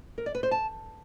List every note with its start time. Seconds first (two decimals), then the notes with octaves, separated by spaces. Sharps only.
0.18 A#4
0.26 D5
0.35 B4
0.43 C5
0.51 A5